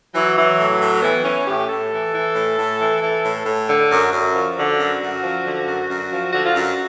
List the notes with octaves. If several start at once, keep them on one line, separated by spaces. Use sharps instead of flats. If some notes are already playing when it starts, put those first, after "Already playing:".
E3 F#3
E3
A2
A2
E3 B3
E3 C#4
A2 G4
A2 A4
E3
E3
A2
A2
E3
E3
A2
A2
D3
F#2
F#2
F3
D3 F#4
F#2
F#2
F3
D3
F#2
F#2
F3
D3 F#4
F4
F#2 F#4